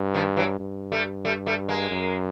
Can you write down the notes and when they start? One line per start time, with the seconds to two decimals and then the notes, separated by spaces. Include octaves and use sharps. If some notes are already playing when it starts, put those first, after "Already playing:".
Already playing: G2
0.14 D#3 F3
0.36 E3 F#3
0.59 G2
0.92 G3 A3
1.25 G3 A3
1.46 G3 A3
1.68 G#3 A#3
1.91 F#2